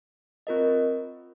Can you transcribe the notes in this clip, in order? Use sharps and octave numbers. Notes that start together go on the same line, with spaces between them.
C4 F4 A#4 D#5